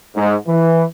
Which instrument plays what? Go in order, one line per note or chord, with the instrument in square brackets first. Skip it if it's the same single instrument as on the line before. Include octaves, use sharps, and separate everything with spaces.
[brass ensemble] G#2
E3